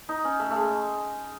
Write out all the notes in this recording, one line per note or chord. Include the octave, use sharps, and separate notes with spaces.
D#4
C#4
A3
A3
G#3